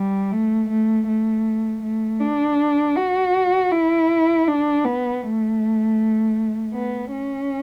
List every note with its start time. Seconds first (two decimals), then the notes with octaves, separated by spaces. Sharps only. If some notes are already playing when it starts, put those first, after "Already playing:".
Already playing: G3
0.32 A3
0.69 A3
1.08 A3
1.82 A3
2.20 D4
2.96 F#4
3.72 E4
4.47 D4
4.85 B3
5.23 A3
6.74 B3
7.11 C#4